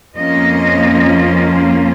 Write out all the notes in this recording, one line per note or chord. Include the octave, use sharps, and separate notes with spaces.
F2 F3 A#3 C#4 F4 D#5